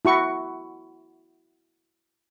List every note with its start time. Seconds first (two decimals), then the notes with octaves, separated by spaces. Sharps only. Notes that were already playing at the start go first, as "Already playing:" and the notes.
0.05 E4 F#4 C#6